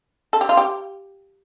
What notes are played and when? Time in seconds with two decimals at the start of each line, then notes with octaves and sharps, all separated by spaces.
0.33 A4
0.41 G4
0.49 F4
0.57 G4